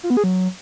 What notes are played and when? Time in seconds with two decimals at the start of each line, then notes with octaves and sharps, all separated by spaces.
0.03 F4
0.10 B3
0.17 G#4
0.24 F#3